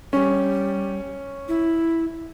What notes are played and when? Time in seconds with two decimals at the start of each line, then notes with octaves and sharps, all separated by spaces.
0.13 G3 C#4
1.48 E4